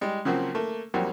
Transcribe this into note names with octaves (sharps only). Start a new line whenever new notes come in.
G3 G#3
C#3 F3 F#3 A#3 C4
A3 A#3
F2 F#3 G3 A#3